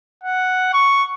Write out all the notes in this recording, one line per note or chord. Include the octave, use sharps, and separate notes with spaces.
F#5
C#6